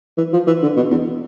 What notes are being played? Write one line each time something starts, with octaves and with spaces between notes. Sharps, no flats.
E3
F3
E3
D3
B2
E2